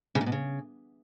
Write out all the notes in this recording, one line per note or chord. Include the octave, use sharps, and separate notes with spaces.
C#3
A#2
B2
C#3